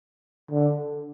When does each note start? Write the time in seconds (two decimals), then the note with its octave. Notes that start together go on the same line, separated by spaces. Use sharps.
0.50 D3